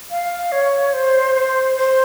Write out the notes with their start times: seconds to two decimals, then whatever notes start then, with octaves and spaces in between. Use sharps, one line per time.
0.11 F5
0.52 C#5
0.93 C5
1.35 C5
1.76 C5